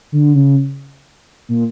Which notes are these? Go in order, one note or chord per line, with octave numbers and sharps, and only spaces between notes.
D3
C#3
A#2